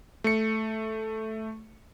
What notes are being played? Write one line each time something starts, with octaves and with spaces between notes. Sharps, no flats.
A3 C#7